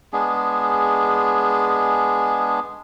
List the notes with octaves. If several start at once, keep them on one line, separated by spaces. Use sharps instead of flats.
G#3 B3 D4 G#4